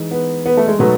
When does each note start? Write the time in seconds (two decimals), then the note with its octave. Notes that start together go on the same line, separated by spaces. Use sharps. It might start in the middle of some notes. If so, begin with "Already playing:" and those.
Already playing: E3 G#3 D#4
0.11 B3
0.46 B3
0.57 A3
0.68 G#3
0.79 B2 F#3 A3 B3 D#4